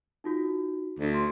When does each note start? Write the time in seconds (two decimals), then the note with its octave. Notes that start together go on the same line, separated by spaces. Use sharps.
0.24 D#4 F4 F#4
0.99 D2
1.14 C6